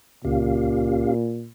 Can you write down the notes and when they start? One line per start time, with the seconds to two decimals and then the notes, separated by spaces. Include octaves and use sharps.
0.25 C#2 A#2 C#4 G4 F5